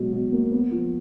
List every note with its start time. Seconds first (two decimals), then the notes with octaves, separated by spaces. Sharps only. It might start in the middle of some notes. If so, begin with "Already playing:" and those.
Already playing: B2 F#3 G#3
0.13 B2
0.32 A#3
0.52 B3
0.71 F3